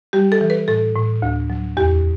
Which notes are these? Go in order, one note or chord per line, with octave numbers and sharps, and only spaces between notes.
G3 G4
A4
E3
B4
A2 A4
A2
D2
F#3
E2 G4